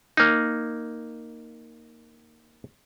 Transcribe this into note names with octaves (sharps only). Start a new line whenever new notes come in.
A#3 D#4